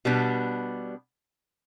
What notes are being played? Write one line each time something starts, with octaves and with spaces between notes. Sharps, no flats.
B2 G3 B3 D4